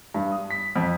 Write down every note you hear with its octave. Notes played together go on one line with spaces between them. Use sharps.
G2
D#6
B6
F2